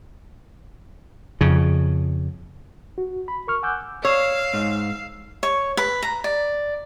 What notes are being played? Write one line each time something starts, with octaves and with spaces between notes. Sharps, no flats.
F2 C#3
F#4
B5
A#4 C#6 F6
F#5 G#5 D6 E6 F#6 G6
C#5 F5 E6 C7 E7
G#2
C#5
B4
A#5
D5